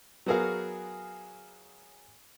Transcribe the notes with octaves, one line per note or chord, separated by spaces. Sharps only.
F#3 B3 F#4 G#4 A#4 F5